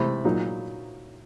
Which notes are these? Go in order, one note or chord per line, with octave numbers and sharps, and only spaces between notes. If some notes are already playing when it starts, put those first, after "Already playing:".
Already playing: C3 E3 A3 C4 B5
A#2 F#3 A#3 D#4